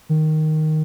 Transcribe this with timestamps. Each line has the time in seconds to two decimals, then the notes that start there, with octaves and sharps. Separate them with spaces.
0.09 D#3